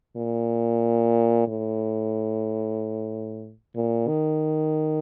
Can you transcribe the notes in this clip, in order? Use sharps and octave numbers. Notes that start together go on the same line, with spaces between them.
A#2
A2
A#2
D#3